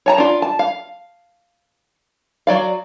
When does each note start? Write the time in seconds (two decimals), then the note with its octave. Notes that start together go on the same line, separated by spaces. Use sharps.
0.06 C#5 A5 A#5
0.18 D4 F4
0.42 A5
0.59 F5
2.47 F#3 D5 F5